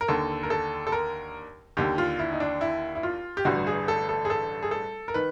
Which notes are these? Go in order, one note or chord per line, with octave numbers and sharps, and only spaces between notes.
A#4
D#2 D3 A4
A#4
A4
A4
A#4
D#2 D3 G4
F4
E4
D#4
D4
E4
E4
F4
G4
A1 G2 D3 F#4
G#4
A4
A4
G#4
A4
G#4
A4
A#4
D#3 B4